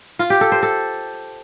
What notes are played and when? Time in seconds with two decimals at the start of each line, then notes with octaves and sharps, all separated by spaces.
0.19 F4
0.30 G4
0.41 A4
0.52 C5
0.63 A4